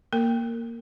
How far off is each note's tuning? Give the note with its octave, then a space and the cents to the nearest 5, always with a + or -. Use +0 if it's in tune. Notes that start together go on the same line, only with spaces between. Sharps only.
A#3 +0 A#4 -25